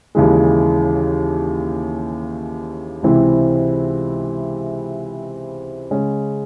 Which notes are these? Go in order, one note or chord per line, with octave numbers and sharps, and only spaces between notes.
D#2 C#3 E3 G#3
C#2 C3 E3 C4 E4
C#3 G#3 C#4